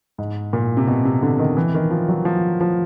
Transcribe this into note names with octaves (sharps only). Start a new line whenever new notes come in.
G#2
A#2
C3
B2
C3
D3
D#3
E3
D#3
F3
F#3
F3
F3